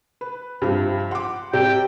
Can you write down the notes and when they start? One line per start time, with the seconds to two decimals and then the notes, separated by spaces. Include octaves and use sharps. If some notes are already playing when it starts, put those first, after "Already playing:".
0.21 B4
0.62 G2 C3 F3
1.11 F#5 C6 D6
1.53 C3 D5 G5